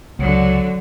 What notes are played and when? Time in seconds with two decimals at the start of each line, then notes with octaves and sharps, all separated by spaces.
0.19 C#2 D3 F#3